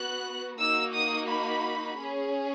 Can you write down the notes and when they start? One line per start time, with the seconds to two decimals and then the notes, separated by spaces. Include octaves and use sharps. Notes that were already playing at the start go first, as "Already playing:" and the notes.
Already playing: B3 F#4 F#6
0.59 A#3 D#4 F#4 E6
0.94 D#6
1.28 B5
1.97 C#4 G#4